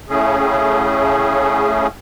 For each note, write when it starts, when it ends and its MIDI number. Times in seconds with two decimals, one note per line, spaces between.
0.09 1.87 45
0.09 1.87 49
0.09 1.87 57
0.09 1.87 61
0.09 1.87 68